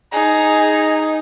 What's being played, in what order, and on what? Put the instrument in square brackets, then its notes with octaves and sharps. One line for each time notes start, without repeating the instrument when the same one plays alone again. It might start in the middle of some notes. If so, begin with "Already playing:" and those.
[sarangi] D#4 [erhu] G#4 [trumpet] A#5